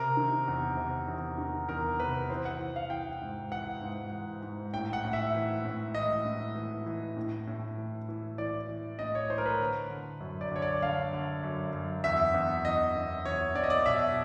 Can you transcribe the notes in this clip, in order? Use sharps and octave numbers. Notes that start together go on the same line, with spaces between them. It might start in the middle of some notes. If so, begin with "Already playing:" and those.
Already playing: C3 A#4
D#3
E2
C3
E2
D#3
E2 A#4
C3 B4
E3 C5
F#5
E3
F5
E3 G5
G#2
E3 F#5
G#2
E3
G#2
A2 G5
F#5
A2
E5
E3
A2
E3 D#5
A2
E3
E3
A2
A2
E3
E3
E3 D5
E3
A2 D#5
C#5
E3 C5
A#4
B4
D3
D3
F#2
D5
D3 C#5
D5
D3 F5
D3
F#2
F#2
E2 E5
E2
E2 D#5
E2
E2 C#5
E2 D5
D#5
D5
B2 E5